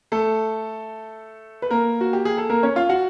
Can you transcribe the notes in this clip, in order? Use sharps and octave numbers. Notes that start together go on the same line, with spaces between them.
A3 A4
B4
A#3 A#4
F#4
G4
G#4
A4
A#3 A#4
C#4 C#5
F4 F5
F#4 F#5